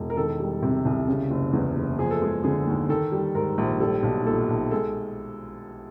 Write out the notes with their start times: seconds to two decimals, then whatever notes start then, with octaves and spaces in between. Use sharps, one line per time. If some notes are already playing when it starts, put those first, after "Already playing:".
Already playing: E1
0.10 A#4
0.17 D#3 A4
0.40 G3
0.62 C3
0.85 C2
1.08 C#3
1.31 F#1
1.53 E2
1.76 F#1
1.99 F3 G#4
2.11 A4
2.22 G#3 G#4
2.44 D3 G#4
2.67 D#2
2.89 D#3 A4
3.12 G3
3.35 G#2 A#4
3.58 A#1
3.80 G3 A4
4.03 B1
4.26 A#2 A4
4.48 B1
4.71 G#3 A4